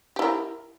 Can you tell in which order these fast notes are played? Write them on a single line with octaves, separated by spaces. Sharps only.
G4 E4 A#4